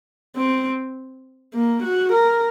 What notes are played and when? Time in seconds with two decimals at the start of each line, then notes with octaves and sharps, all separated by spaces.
0.37 C4
1.55 A#3
1.83 F#4
2.13 A#4